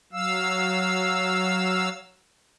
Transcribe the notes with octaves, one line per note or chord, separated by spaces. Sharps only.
F#3 F5 E6